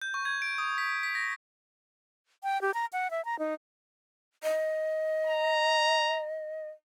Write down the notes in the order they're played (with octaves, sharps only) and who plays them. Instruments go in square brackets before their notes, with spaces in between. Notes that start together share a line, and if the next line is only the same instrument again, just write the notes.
[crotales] G6
C#6
G#6
D7
D#6
B6
B6
A#6
[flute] G5
G4
A#5
F#5
E5
A#5
D#4
[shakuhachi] D#5
[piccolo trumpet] A#5